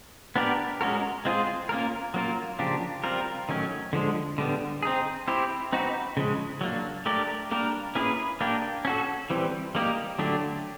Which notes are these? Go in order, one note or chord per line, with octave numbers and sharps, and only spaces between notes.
B3 D4 G4 A#4
G#3 C#4 F#4 A#4
G#3 C4 F4 G#4
A#3 C#4 F4 A#4
F#3 A#3 C#4 F4 A#4
C#3 F3 A#3 D4 G4
G3 C4 F4 A#4
D#3 F#3 A3 C#4
D3 F3 G#3
D3 G3 B3
C4 D#4 G#4
C4 E4 G4
C4 D#4 F#4 B4
C#3 F3 G#3
F#3 A#3 D4
A3 D4 G4 A#4 D5
G3 A#3 D4 G4 A#4
A#3 C#4 E4 G#4 B4
A#3 D4 G4
C#4 F#4 A4
E3 G3 C4
G3 A#3 D#4 G4
D3 F#3 A3 D4 G4